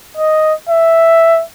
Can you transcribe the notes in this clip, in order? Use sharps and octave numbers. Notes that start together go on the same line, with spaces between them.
D#5
E5